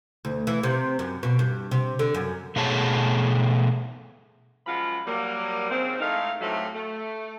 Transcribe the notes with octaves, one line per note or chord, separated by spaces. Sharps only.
D2
E3
C3
F#2
B2
G2
C3
D3
F#2
B2 A3 G#4 C#5 A5
F#2 F3 G#3 F4 F#5 B5
F#3 G3 A#3
G#2 C#3 F3 C4
A2 G#3 A3 D#4 A#4 F5
A2 C3 F3 F#3 A3
A3